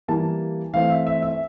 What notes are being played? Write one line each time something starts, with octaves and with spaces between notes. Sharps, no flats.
E3 G3 A#3 A5
E3 A3 C4 F5
E5
E5
E5